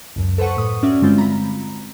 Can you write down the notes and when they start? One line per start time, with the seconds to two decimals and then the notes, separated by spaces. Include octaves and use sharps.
0.16 C#2 F#2
0.38 A4 B4 C5 F#5 C#6
0.57 A2 D#6
0.83 C#4 F#4 D5 E5
1.01 G2 D3 G3 G#3 C4 F4
1.18 A#5 B5